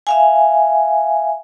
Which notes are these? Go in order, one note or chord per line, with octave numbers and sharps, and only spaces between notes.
E5 F5 G#5